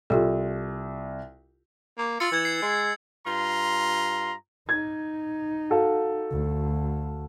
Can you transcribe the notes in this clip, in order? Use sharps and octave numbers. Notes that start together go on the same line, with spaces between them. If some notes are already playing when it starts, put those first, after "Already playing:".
C2 F4 G4 A4
A#3
F4 E6 A6 C#7
E3 E6 G#6
C7
G#3
G2 F4 A#5 C6
D#4 G#6
F#4 A4 F5
D2